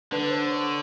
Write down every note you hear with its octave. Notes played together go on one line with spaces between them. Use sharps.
D3 B4
C5
C#5